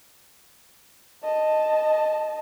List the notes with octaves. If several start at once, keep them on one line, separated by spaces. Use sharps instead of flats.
D#5 A5